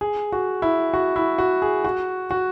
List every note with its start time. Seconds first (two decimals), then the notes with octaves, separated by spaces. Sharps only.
0.01 G#4
0.32 F#4
0.62 E4
0.94 F#4
1.16 E4
1.38 F#4
1.62 G#4
1.85 F#4
2.31 F#4